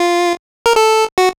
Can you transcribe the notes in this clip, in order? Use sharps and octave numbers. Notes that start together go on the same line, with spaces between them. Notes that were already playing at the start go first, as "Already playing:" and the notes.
Already playing: F4
A#4
A4
F#4